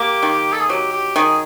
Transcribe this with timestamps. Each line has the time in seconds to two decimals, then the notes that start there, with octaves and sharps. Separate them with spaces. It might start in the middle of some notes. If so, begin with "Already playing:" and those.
Already playing: A#3 G4
0.23 D#3
0.52 A4
0.61 G#4
0.69 F#3 G4
0.93 G4
1.16 D#3 G#4